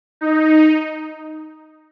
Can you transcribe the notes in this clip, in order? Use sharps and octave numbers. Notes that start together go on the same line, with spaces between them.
D#4